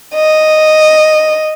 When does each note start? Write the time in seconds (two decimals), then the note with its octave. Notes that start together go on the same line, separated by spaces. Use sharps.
0.14 D#5